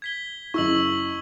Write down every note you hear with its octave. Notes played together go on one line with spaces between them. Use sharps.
G#6 B6 G7
F#1 E4 C#6 E6 F#7